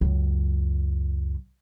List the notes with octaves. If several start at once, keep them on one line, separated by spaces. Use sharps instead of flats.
C#2 F#2